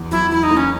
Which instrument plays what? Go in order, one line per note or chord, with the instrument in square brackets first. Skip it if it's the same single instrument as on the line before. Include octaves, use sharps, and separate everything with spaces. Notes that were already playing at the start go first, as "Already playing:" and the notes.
Already playing: [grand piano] E2
[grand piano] F#3 [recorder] E4
[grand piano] E2 [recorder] E4
[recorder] D#4
[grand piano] A#3
[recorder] C#4